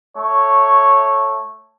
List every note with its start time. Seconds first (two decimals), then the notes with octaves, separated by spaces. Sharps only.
0.17 A3 C#5